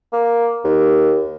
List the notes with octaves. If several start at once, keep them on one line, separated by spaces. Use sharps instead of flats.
A#3
D#2